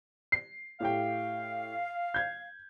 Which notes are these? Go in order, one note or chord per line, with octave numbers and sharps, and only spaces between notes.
C7
A2 G4 F5 G5
G6 G#6